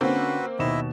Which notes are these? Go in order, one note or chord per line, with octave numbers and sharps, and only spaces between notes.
D3 A#3 C4 C#4 F#4 B4
D#2 B2 E4 D#5 E5 E7